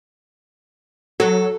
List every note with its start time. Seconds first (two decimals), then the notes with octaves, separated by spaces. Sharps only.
1.20 F#3 A4